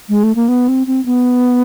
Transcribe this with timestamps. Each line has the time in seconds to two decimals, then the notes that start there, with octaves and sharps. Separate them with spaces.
0.09 G#3
0.23 A3
0.35 A#3
0.48 B3
0.68 C4
0.87 C4
1.06 B3